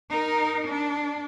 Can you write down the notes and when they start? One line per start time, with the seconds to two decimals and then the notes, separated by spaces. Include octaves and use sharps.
0.10 D#4 A#4
0.67 D4